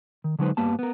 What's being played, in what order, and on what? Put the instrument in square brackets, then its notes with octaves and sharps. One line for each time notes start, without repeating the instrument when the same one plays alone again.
[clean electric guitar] D#3
D3 F#3 G#3 D#4 B4 C5
G2 G3 A#3 B3 A5
B3 A#4